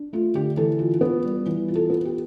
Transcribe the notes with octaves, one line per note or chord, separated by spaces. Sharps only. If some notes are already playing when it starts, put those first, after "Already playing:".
Already playing: D4
A3 F4
D3 G4
E3 A4
F4
B3
G3
E3
F4
A4
B3
G4